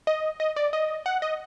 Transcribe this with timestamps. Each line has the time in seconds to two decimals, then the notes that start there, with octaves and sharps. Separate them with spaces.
0.07 D#5
0.40 D#5
0.56 D5
0.73 D#5
1.06 F#5
1.22 D#5